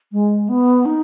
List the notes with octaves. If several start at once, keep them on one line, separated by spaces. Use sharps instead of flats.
G#3
B3
D#4